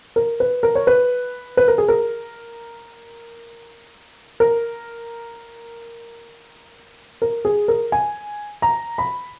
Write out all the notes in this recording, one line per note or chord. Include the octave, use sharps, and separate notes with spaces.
A#4
B4
A#4
C#5
B4
B4
A#4
G#4
A#4
A#4
A#4
G#4
A#4
G#5
A#5
B5